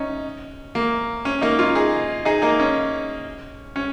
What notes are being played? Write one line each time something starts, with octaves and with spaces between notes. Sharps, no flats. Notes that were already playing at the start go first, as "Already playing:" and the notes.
Already playing: C#4 D#4
A#3
C#4
A#3 D#4
C#4 F4
D#4 G#4
D#4 G#4
A#3 D#4
C#4
C#4